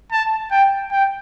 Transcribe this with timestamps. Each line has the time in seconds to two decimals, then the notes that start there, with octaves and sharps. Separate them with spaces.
0.12 A5
0.51 G5
0.91 G5